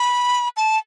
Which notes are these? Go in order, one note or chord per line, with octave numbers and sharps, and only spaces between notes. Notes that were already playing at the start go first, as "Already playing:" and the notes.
Already playing: B5
A5